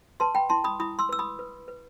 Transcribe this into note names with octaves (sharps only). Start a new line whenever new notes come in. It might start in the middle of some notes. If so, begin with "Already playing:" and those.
B4 A5 C6
G5 B5
E4 A5 C6
B5 D#6
E4 B5 D#6
C6 E6
B4 E6
B5 D#6
B4
B4